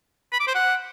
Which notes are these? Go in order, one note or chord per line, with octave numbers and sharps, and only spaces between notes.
B5
D6
C5
F#5